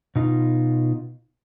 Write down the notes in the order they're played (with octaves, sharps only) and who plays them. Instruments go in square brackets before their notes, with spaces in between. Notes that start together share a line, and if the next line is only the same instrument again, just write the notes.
[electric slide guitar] B2 D#4 F4